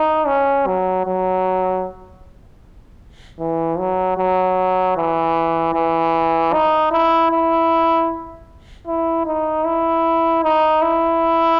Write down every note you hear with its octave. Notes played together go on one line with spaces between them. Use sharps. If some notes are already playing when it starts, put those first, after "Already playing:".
Already playing: D#4
C#4
F#3
F#3
E3
F#3
F#3
E3
E3
D#4
E4
E4
E4
D#4
E4
D#4
E4